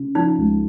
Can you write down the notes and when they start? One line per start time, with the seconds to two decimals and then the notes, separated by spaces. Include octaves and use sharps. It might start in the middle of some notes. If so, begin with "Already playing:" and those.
Already playing: C#3
0.15 F3 D#4
0.38 C#2